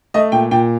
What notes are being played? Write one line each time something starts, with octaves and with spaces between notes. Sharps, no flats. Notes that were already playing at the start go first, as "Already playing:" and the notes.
A3 D#5
A#2 G5
A#2 G5